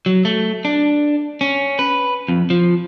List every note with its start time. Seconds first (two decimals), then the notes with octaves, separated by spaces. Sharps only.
0.06 F#3
0.25 A3
0.65 D4
1.41 C#4
1.79 B4
2.28 F2
2.50 F3